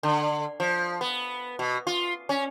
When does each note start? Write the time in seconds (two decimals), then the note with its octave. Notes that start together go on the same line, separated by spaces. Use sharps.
0.03 D3
0.60 F3
1.01 B3
1.59 B2
1.87 F4
2.29 C#4